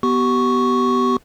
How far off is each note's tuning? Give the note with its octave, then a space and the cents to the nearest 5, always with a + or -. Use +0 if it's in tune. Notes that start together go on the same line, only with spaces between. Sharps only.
B3 +0 G4 -30 C#6 +0